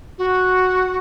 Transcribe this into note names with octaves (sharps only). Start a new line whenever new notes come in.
F#4